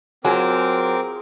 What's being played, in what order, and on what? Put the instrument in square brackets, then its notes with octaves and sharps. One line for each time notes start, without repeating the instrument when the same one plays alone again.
[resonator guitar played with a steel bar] F#3 [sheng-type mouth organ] C4 A#4 D6 [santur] F4 G#4